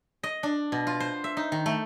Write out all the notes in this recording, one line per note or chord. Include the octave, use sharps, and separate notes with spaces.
D#5
D4
B2
F4
C5
E5
D#4
D#3
A3